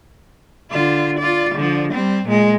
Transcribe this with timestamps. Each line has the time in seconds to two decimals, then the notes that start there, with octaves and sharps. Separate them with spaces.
0.71 D3 F4
1.19 F4 D5
1.55 D3 F3
1.93 G3 C4
2.25 A#2 G#3